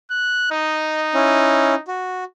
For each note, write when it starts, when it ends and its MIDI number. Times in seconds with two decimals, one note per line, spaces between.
0.10 0.48 90
0.51 1.82 63
0.51 1.00 75
1.14 1.75 61
1.14 1.75 64
1.88 2.24 66